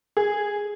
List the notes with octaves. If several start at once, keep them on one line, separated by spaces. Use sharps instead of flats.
G#4